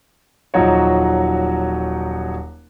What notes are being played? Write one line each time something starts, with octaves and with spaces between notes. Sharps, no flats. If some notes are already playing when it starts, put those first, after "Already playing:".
D#1 F3 F#3 D#4 F#4 C#5